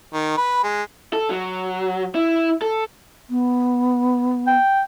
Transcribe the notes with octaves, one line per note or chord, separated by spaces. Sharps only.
D#3
B4
G#3
A4
F#3
E4
A4
B3
G5